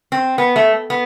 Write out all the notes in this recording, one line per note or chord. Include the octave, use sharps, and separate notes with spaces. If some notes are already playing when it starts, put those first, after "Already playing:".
C4
B3
A3
B3